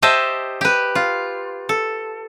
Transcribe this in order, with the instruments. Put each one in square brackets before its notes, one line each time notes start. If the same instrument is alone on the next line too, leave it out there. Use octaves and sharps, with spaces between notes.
[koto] G4 C5 D#5 E5 A5
G4 B4
F4
A4